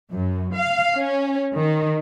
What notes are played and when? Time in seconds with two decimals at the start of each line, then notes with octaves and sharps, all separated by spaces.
0.12 F#2
0.56 F5
0.97 C#4
1.55 D#3